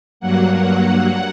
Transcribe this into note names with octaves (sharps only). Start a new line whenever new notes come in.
G2 F#3 A#3 F#5
F#5